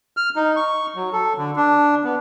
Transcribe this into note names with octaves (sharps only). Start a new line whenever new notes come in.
F6
D#4
C#6
F#3
A4
D3
D4
B3